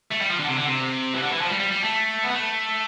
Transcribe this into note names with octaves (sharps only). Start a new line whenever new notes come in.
A3
G3
F3
D3
C3
D3
C3
E3
D3
E3
F3
G3
G3
G3
A3
B3
A3